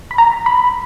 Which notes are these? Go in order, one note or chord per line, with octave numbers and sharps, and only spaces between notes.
B5
A#5
B5